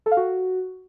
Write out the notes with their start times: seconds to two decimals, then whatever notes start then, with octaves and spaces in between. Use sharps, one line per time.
0.06 A4
0.11 F5
0.17 F#4